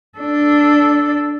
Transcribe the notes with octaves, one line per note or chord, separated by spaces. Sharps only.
D4 A4